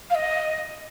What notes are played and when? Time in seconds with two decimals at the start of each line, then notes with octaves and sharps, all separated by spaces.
0.10 F5
0.15 D#5